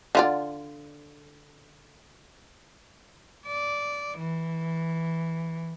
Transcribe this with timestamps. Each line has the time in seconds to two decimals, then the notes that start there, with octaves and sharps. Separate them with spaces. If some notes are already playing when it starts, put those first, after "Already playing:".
0.15 D3 F4 D5
3.45 D5
4.18 E3